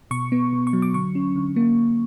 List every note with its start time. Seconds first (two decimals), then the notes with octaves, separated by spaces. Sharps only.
0.11 B2 C#6
0.32 B3
0.53 B2
0.67 C#6
0.73 F#3
0.82 D6
0.94 D3 C#6
1.15 C#4
1.36 D3
1.56 A#3